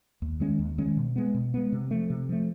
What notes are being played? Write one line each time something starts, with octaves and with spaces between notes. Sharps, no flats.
D#2
D#3 G#3 C#4
D#2
D#3 G#3 C#4
B2
G#3 B3
B2
G#3 B3
C3
F3 A3
C3
F3 A3